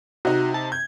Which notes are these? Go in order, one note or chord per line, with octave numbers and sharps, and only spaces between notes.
C3 D#4 F#4
A5
G6 G#6